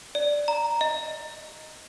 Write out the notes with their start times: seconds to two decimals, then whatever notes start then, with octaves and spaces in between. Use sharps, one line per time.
0.15 D5
0.48 A#5
0.81 D#5